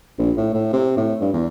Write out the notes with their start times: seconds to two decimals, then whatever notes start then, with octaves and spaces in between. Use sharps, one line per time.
0.19 A#1
0.37 A2
0.54 A2
0.73 C3
0.97 A2
1.21 G2
1.33 E2